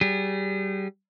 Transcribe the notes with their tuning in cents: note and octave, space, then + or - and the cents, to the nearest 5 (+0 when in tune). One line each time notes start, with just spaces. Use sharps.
G3 -25 G#4 -30